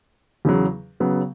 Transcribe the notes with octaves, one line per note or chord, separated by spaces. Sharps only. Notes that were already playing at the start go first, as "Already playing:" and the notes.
E2 C#3 F#3
C#3 F#3 B3